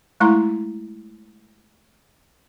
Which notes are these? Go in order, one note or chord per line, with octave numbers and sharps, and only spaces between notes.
G#3 A3 E4 A#5 C6